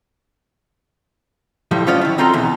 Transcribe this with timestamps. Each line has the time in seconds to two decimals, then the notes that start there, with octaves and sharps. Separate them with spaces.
1.71 A2 F3 G3
1.87 F#3 C#4 F4 D5 D#5
2.01 D#3 E4
2.18 C4 D#4 F4 A4 A#5 C6
2.34 E2 B2